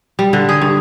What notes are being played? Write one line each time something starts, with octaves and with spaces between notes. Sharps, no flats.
G3
D3
G#4
G2